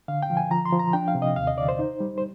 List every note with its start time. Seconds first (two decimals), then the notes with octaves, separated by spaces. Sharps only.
0.08 D3 F5
0.23 G5
0.30 F3
0.37 G#5
0.51 F3 A#5
0.65 C6
0.73 F3
0.79 A#5
0.93 D4 G5
1.08 F5
1.15 C3
1.22 D#5
1.36 D#2 F5
1.47 D#5
1.57 D3 D5
1.69 C5
1.79 D#4
2.00 G3
2.18 C5